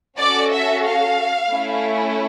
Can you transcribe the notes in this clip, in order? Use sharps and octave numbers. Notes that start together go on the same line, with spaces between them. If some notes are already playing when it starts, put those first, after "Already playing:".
C#4 F#4 A4 D5
E5
F5
A3 C#4 E4